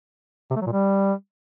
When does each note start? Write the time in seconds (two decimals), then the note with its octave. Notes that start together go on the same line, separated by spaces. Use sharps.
0.50 C3
0.56 A3
0.61 F#3
0.67 A#2
0.72 G3